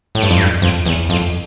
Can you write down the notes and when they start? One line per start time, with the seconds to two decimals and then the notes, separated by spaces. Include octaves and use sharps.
0.15 A2
0.23 G2
0.30 F2
0.38 G2
0.62 F2
0.86 E2
1.10 F2